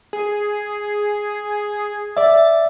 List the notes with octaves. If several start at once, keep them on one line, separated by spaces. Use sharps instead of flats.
G#4
D5 E5 A6